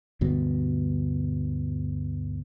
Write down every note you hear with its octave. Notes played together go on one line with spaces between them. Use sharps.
D2 G2 B2